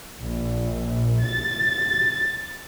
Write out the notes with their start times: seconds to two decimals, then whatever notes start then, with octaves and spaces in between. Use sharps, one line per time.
0.20 A#1
1.25 A6